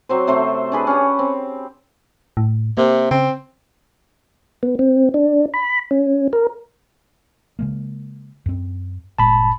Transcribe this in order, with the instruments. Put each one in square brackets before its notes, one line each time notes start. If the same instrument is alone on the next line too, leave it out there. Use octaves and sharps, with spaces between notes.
[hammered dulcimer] F#3 C4 C5
C3 A3 C5
D4 G#4 B4
C#4 G4
C4
[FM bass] A2
[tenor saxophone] C3 [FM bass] A#3
[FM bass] C#3 [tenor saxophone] C4
[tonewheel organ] B3
C4
D4
B5
C#4
A#4
[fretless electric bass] C#3 G#3 A#3
F#2 C4
[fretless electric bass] G1 A#2 G#3 [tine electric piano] A5 B5